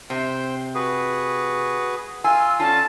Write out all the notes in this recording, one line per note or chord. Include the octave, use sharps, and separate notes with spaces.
C3 C5 G5
F#4 G#4 B4
F4 G#5 C6 E6
D3 C#4 F4 A5